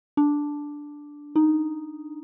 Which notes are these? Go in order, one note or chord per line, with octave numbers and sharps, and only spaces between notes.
D4
D#4